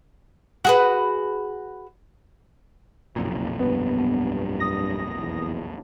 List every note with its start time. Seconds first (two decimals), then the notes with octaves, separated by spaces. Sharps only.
0.65 F#4 G#4 B4
3.16 F#1 B1 F2 A#2
3.60 G2 B3
4.60 D#6 A#6
5.19 E2